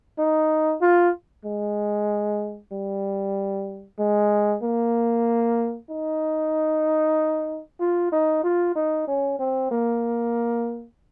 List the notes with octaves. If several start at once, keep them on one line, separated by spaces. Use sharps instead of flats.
D#4
F4
G#3
G3
G#3
A#3
D#4
F4
D#4
F4
D#4
C#4
C4
A#3